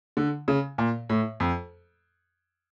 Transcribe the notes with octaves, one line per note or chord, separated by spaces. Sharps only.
D3
C#3
A#2
A2
F2